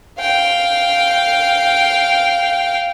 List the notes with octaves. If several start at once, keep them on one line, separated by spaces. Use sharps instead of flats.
F5 G5